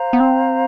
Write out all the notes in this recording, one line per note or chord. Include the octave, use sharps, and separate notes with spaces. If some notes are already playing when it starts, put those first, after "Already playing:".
Already playing: C5 F5 A#5
B3
C4